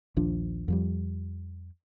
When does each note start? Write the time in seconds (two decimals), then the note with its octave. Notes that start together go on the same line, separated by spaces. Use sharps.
0.17 A#1 D#2 F3 D4
0.68 F2 F3 G3